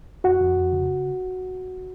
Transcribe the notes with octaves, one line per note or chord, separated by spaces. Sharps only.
F2 F#4 F#5
F2
F2
C#3